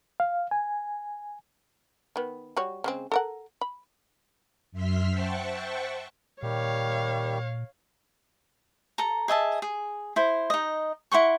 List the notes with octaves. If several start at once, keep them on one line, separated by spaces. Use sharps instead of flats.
F5
G#5
D#3 B3
G3 F#4 C#5
C#3 G#3 C4
A4 A#4 F#5
B5
F#2 E5 C6 F6 B6
C5 E5 F#5 G5 A5 C#6
A#2 D#3 G3 G4 C#5 F5
A4 A#5
G#4 D#5 E5 A5
G#4
E4 C5
D#4 D#5
E4 F#5 C6 C#6